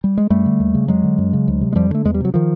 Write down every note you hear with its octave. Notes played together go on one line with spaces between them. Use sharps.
G3
G#3
F#2 G3 A3
D3
D#2
C#3
F2 F#3 G#3
D3
F#2
C#3
D2
C3
G#3
F2 F3 G3
D3 A3
E2 G#3
G3
C3 F#3
D#3 F3